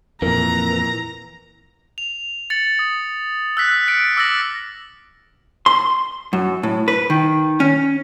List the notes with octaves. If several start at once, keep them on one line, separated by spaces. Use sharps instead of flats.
F2 A#2 E3 A#4 A#5
F7
A6 C#7 F#7
D#6
E6 F#6 B6 F#7
F6 F#6 A6 C#7 D7
D6 E6 F6 A6 A#6 F#7
C6
F#2
A2
B4
D#3
C#4